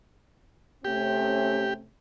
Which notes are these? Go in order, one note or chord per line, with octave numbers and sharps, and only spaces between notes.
C3 A3 C#4 G4